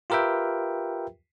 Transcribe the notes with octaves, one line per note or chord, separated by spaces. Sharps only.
F4 G4 A#4 B4 E5 G5